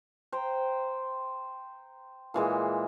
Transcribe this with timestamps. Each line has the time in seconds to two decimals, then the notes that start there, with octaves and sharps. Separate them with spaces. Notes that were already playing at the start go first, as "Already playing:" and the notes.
0.32 C5 G5 A#5
2.34 A#2 E3 G#3